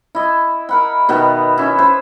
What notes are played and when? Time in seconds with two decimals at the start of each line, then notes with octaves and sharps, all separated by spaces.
0.15 E4 D#5
0.69 A#4 F#5 B5
1.09 B2 D#3 B3 E5
1.58 C#4 E4
1.78 B4 C5 E5